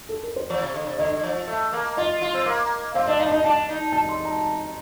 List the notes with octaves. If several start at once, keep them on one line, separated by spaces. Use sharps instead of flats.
A4
A#4
C5
F3 D5
C3
D3
C3
D3 D#5
F3
A3
A#3
F4 D#5
F4
C4
A#3
C4 F5
D4 D#5
D#4 F5
D4
D#4 D#5
D4 A5
D#4
A5
C6
A#5